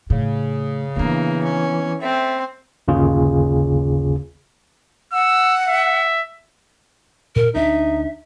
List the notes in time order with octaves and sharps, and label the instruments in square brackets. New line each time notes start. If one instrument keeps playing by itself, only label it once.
[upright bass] A2 [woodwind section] C#3
[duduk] E3 [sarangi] A#3 [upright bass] B3 D4
[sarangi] C#4
[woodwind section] A3 A4 E5 [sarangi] C4
[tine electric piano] G1 D#2 C#3 F4 G#4
[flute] F#5 [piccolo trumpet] E6
[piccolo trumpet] E5
[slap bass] A#2 [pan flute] A#4
[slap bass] D2 A#3 D4 [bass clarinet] D#4 [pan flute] E5